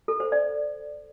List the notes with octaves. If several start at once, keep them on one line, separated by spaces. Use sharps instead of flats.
A4
C5
D5